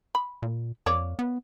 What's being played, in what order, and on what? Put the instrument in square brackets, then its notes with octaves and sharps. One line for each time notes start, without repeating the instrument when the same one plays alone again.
[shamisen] B5
[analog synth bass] A#2
[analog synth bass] F2 [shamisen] A#3 C#5 D5
[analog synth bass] B3